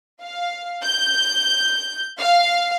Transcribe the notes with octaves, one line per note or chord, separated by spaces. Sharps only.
F5
G6
F5